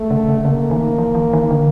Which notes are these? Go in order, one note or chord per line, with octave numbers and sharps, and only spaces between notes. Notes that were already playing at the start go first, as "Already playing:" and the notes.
Already playing: A3
C#3
C#3
C#3 A#3
D#3
E3
E3
D#3
D3